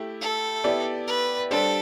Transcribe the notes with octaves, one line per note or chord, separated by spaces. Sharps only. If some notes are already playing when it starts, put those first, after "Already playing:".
Already playing: A3 E4 G4
A4
B3 E4 G4 D5
B4
G3 D4 G4 A4 C5